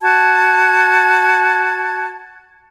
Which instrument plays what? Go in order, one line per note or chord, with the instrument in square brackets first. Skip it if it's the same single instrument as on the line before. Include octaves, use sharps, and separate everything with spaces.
[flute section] F#4 A5 G#6